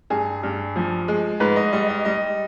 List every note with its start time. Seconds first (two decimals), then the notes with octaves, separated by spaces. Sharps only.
0.10 G2 G#4
0.43 G2
0.76 F3
1.08 G#3
1.40 G#2 B4
1.56 D#5
1.73 G3 D#5
1.89 D#5
2.05 G3 D#5